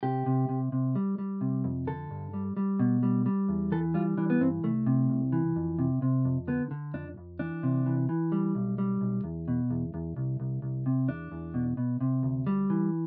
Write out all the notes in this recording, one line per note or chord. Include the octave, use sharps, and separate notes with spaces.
C3 G4
C3
C3
C3
G3
G3
C3
F2
D3 A4
G2
G3
G3
B2
G3
G3
E2
E3 A4
G3 F4
E3 D4
B3
G2 C4
C2 A3
C3
C2
E3
F2
C3
C3
F2
D3 B3
D3
F2 D4
F2
E3 D4
C3
E3
E3
G3
B1
G3
B1
E2
B2
E2
E2
C2
C2
C2
C3
E2 D4
E2
B2
B2
C3
D2
G3
E3